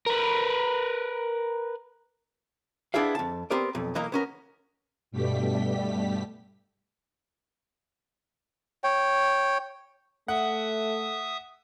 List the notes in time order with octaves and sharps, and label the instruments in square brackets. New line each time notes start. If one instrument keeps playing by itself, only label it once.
[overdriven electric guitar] A#4 B4
[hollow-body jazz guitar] B3 D4 E4 G#4 A4 F5
F2 A5
B3 C4 G4 A#4 D5
B1 F2
B1 E3 A#3 D#5 A#5
B3 C#4 A#4
[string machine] G2 B2 G3 A3 G4 B6
[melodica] C#5 G5
[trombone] A3 [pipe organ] E5 D#6 [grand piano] F#5